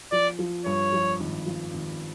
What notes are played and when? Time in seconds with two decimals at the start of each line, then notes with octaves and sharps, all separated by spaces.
0.12 F3 D5
0.39 F3
0.66 G2 C#5
0.93 F3
1.20 G#1
1.46 F3
1.74 G#1